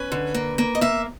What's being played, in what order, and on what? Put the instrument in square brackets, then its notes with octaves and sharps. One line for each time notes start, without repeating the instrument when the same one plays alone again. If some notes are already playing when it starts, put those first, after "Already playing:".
Already playing: [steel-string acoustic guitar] C#4 B4
D3
A#3
A#3
D#5
A#3 E5